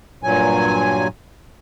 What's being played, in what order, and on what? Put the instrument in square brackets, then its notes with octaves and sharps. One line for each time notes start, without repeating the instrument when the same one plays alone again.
[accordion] G2 A#2 F#3 G#5